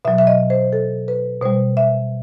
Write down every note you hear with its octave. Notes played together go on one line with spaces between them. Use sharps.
B2 F#3 E5
E5
D#5
C5
A4
B4
B2 G3 C5
E5